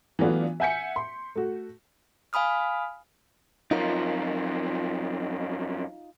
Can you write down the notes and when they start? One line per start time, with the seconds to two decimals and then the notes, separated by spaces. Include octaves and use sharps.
0.19 E3 F#3 A3 B3 D4 F4
0.60 E5 F#5 G#5 G6 B6 C#7
0.96 C6
1.36 A3 F#4
2.33 F5 G#5 B5 D#6 F6
3.71 F#2 F3 D#4 F4 A#4